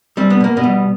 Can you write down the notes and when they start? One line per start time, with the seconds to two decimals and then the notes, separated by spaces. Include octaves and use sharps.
0.17 G3 C4
0.30 B3
0.40 B2 A#3
0.57 B2 B3
0.63 G3